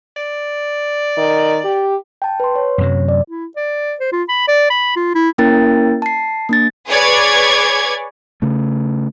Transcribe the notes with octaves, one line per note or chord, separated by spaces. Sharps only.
D5
D#3
G4
G5 A5
B4 C6
C#5
F#2 C3 F#3
D5
E4
D5
C5
F4
B5
D5
B5
F4
E4
A#3 C#4 E4 A#4 G5 A6
A5 C7
A#3 D4 A6
G#4 B4 C#5 D5 G#6
C#3 A3